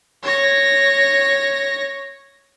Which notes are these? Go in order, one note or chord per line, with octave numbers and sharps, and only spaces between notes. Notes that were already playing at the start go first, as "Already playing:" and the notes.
C#5 A#6